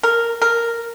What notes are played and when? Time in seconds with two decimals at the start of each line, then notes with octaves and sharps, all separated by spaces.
0.03 A#4
0.42 A#4